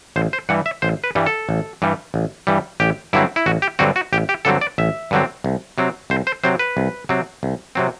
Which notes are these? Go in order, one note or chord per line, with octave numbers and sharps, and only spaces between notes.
A1 C5
C5
G2 E3 G3 F#5
E5
A1 C5
B4
G2 E3 G3
A4
A1
G2 E3 G3
A1
G2 E3 G3
A1 G4
G2 D3 F#3 C4 E4
E4
A1 F#4
G4
G2 D3 F#3 C4 F#4
F#4
A1 G4
G4
G2 D3 F#3 C4 A4
D5
A1 E5
G2 D3 F#3 C4
C2
C3 F#3 C4
C2 C5
C5
C3 F#3 C4 C5
B4
C2
C3 F#3 C4
C2
C3 F#3 C4